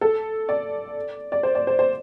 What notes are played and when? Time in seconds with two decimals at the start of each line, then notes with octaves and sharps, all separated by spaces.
0.01 A4
0.49 D5
1.32 D5
1.43 C5
1.55 D5
1.67 C5
1.79 C5